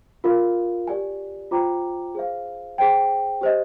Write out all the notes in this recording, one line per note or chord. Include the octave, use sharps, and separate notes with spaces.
F4 A#4 F5
G4 D5 G#5
F4 C5 G5 A#5 D6
G#4 C5 F5
G#4 C5 G5
G4 C5 D#5